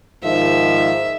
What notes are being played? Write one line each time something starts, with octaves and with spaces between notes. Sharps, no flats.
G#2 D#3 F3 E5